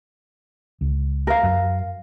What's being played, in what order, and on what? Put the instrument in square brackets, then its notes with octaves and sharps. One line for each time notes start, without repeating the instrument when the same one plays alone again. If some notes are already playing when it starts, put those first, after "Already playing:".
[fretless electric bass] C#2
[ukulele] A#4 F5
[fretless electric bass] F#2